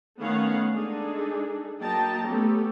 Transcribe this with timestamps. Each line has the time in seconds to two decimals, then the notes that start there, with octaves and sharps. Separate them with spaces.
0.18 D#3 A3 B3 C#4 F5 F#5
0.71 G#3 D4 D#4 G#4 A4
1.79 F#3 A#3 D#5 G5 A5 A#5
2.23 A3 B3 C#4 G4 A4